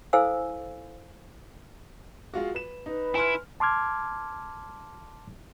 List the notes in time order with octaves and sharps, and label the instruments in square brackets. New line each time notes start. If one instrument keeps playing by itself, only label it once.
[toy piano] E4 A4 C5 F5 G#5 E6
[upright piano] G#3 F4 F#4
B4 E7
[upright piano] D#4 [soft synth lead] B4
[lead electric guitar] E4 [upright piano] G#5 C6 F6
[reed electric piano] A5 C6 D6 F6 G#6